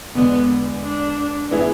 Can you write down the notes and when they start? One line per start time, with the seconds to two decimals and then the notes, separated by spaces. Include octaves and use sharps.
0.15 E2 D3 G#3 B3 D4
0.82 D4
1.51 E3 B3 E4 G#4